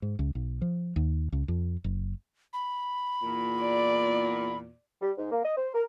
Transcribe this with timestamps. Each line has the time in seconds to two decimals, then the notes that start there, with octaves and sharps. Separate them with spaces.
0.02 G#2
0.19 C#2
0.35 B1
0.62 F3
0.96 D#2
1.32 C#2
1.48 F2
1.84 F#1
2.53 B5
3.22 E2 A#2
3.61 D5
5.02 G3
5.18 G#2
5.32 A#3
5.45 D#5
5.58 C5
5.75 A#4